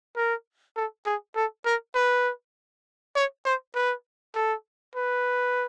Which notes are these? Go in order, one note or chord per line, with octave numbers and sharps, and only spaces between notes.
A#4
A4
G#4
A4
A#4
B4
C#5
C5
B4
A4
B4